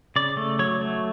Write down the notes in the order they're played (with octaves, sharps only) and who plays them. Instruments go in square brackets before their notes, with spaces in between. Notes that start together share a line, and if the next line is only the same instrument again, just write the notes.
[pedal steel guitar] C#3 D5
A3
F#3 C#5
A3